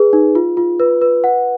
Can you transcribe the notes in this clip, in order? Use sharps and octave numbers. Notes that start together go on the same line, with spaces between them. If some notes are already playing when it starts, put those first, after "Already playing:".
Already playing: G#4 B4
D#4
F4
F4
B4
B4
F#5